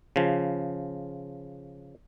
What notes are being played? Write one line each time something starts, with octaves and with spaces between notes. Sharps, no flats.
C#3 F3